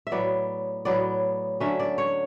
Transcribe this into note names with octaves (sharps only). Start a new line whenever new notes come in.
E5
A2 F#3 B3 D5
A2 F#3 B3 D5
D3 F#3 C#4 E5
D5
C#5